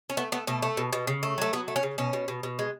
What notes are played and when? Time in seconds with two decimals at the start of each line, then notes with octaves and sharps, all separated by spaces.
0.10 C#4
0.17 A3 B3
0.32 A3 B3
0.47 B2 A3
0.62 A3
0.77 B2
0.93 B2
1.07 C#3
1.23 A3
1.38 F#3 A3
1.53 F#3 B3
1.68 A3
1.76 C#4
1.83 C#3
1.98 B2 C#4
2.13 B2
2.28 B2
2.43 B2
2.59 G#3